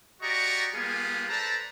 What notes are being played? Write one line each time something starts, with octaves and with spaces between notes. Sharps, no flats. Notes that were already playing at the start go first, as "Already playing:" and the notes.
F#4 G4 D5 D#5 A#5 C#6
G3 A#3 B3 F4 G#4
A4 B4 C5 D5 A5 A#5